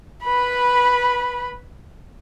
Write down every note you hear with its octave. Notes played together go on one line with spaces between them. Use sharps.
B4 B5